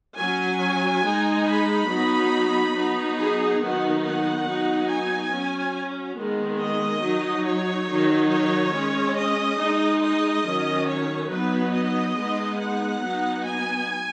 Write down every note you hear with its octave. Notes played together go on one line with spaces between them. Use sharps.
F#3 C#4 G#5
G#3 D#4
B5
F#3 B3 D#4
F#3 B3 D#4
G#4
D#3 F#3 B3 D#4 F#5
F#5
F#3 B3 D#4
G#5
F#3 C#4
D#3 G#3 B3
D#5
F#3 D#4
C#5
D#3 F#3 D#4
C#5
G#3 C#4
D#5
G#3 D#4
D#5
D#3 F#3 C#4
C#5
F#3 B3 D#4 B4
D#5
G#3 B3 D#4
F#5
F#3 B3 D#4
G#5